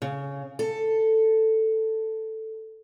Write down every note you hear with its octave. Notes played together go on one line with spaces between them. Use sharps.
C#3
A4